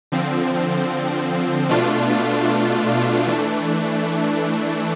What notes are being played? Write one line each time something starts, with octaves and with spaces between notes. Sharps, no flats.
D3 F3 C4
B2 A3 D4 F4
E3 A3 D4